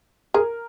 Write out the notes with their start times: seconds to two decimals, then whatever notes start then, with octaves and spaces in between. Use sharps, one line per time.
0.34 G#4 A#4